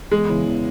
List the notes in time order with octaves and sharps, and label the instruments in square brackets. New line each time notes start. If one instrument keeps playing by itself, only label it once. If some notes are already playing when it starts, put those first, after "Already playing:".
[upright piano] E2 [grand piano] G#3
[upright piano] C#3 E3 B3 E4
E2